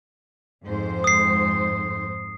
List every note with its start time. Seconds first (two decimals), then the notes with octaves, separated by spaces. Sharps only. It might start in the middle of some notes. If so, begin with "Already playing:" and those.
0.64 F2 G#2 C5
1.04 D#6 C7